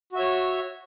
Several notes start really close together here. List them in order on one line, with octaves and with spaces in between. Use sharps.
F#4 E5 C#5